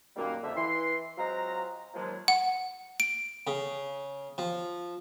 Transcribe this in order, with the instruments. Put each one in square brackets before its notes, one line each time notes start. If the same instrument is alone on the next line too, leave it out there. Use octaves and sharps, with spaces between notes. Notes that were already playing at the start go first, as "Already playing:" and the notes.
[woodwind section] F#2 A#2 D#3 G3 A#3
F2 D3 E5
E3 C6
F#3 G#3 C4 F4 A#5
D#2 F3 F#3 G#3
[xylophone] F#5
D7
[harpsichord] C#3
F3